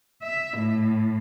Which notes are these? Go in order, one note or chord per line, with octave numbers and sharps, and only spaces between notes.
E5
A2